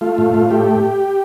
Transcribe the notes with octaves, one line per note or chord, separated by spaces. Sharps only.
A3 F4
A2
A2
A3 G4